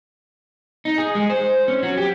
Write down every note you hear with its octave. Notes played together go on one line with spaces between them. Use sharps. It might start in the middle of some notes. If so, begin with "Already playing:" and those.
D#4
G#4
G#3
C5
C#4
F#3
G4